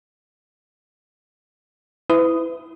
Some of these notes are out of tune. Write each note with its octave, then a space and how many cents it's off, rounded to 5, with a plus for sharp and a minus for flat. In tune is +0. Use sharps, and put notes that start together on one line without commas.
E4 +0 B4 +35 D#6 +0